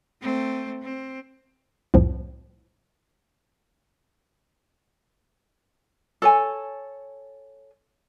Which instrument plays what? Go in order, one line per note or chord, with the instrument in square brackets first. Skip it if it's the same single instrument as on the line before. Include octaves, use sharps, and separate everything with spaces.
[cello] A3 C4
C4
[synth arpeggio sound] C2 F2 A2 F3
[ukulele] A4 C#5 G#5